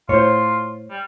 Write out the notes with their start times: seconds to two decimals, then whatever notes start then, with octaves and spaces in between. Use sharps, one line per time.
0.09 A2 F4 C5 C#5
0.90 G3